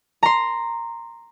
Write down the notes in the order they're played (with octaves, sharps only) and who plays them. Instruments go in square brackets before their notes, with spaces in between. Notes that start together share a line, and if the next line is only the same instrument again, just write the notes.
[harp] A#5 C6